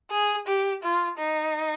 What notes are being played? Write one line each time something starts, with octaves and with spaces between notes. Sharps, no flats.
G#4
G4
F4
D#4